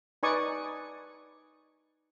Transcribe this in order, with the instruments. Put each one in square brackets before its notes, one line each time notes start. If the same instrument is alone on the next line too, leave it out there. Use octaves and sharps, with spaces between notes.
[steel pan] D#4 B4 D5 G#5 C#6 D#6